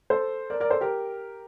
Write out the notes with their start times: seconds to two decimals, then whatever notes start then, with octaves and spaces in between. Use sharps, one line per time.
0.10 A4 C5
0.50 A#4 D5
0.60 A#4 D5
0.70 A4 C5
0.81 G4 A#4